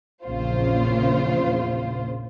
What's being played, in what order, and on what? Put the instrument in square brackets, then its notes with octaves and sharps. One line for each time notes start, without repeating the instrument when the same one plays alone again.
[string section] A#1 E2 A#2 C#3 F4 C5